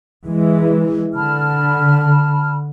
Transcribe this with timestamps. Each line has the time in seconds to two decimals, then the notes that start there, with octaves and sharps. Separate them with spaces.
0.27 E3 G#3
1.15 D3 A5 B5 F6